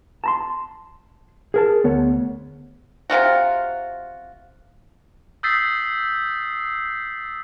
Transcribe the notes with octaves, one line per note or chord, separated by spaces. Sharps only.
A5 A#5 C6
G#4 A#4 A5
D2 B3 C#5
C3 D#3 F4 F#4
D#6 E6 G6 A6 B6 C7